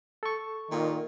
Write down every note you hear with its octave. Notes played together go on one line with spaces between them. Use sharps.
A4 C#6
A#2 D#3